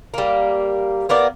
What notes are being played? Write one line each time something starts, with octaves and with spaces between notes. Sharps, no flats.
G3 A#3
A#3 B3 A#4 D5